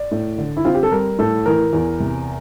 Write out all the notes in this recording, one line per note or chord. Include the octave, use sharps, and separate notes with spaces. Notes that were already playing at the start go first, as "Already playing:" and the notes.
Already playing: D5
A2
D3
E4
C4 F4
G4
A4
G3 A#4
A2 A4
E3 A#4
E2
C3